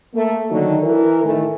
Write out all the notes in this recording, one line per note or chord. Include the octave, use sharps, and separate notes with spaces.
A3 A#3
D3 D#3 F#3 D#4
E3 A#4
A2 D#3 E3 A3